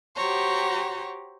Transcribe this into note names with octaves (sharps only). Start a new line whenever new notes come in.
F#4 G4 C5 C#5 A#5